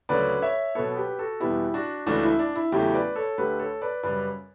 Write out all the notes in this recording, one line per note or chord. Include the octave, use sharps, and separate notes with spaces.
D2 C#3 F#3 B4 D5
C#5 E5
B2 F#3 B3 A4 C#5
G4 B4
F#4 A4
E2 B2 G3 B3 E4 G4
D4 F#4
C#2 C#3 E3 A3 D4 F#4
E4
D4
E4
E2 C#3 F#3 A3 E4 G4
B4 D5
A4 C#5
D2 D3 A3 G4 B4
A4 C#5
B4 D5
F#2 C#3 G3 B4 D5